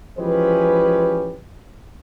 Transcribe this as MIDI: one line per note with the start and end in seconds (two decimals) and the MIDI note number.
0.19 1.37 52
0.19 1.37 53
0.19 1.37 56
0.19 1.37 61
0.19 1.37 67
0.19 1.37 71